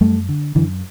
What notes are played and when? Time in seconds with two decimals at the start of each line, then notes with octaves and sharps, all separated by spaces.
0.01 F#2 G3 A3
0.29 D3
0.55 F#2 D3 E3